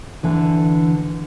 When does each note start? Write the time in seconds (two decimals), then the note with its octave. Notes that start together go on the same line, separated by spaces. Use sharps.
0.23 D3 E3